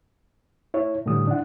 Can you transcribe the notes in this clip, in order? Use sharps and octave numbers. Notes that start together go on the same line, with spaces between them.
E4 C#5
A2 D3 E3 G3 D#6
D4 E4 F#5